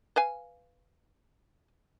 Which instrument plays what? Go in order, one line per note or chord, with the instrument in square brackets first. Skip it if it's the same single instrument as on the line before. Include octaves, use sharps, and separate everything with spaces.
[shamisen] B4 F5 G#5